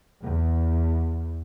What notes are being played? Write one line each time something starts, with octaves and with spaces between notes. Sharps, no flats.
E2